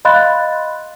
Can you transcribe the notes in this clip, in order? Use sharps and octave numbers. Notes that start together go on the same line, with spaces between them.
D#5 F5 B5 C6 F#6 A6